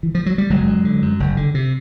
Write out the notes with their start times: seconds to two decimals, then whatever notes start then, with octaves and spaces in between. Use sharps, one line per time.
0.03 E3
0.15 F3
0.26 F#3
0.38 G3
0.50 F#1 F#3 G#3
0.67 F#2
0.85 D3
1.02 F#2
1.20 F#1
1.37 D3
1.54 C3